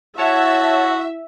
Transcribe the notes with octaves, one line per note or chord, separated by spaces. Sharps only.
E4 F#4 C#5 E5 F#5 A5